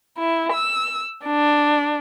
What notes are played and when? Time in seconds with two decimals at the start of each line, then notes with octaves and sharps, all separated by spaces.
0.17 E4
0.52 E6
1.25 D4